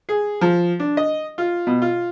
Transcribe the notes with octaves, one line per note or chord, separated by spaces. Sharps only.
G#4
F3
D4
D#5
F4
B2
F4